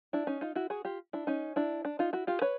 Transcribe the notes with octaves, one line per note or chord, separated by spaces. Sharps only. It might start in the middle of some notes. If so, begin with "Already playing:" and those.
D4 E4
C#4 D#4
D#4 F4
E4 F#4
F#4 G#4
F4 G4
D4 E4
C#4 D#4
D4 E4
D4
D#4 F4
E4 F#4
F4 G4
B4 C#5